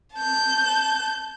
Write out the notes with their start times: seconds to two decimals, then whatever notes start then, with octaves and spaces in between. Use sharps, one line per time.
0.15 A5 G6